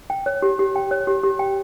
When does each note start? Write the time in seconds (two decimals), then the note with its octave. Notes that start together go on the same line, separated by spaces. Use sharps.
0.10 G5
0.26 C#5
0.42 G4
0.59 G4
0.76 G5
0.91 C#5
1.07 G4
1.23 G4
1.39 G5